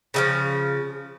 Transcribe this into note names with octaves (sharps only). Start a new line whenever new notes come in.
C#3 E3 F3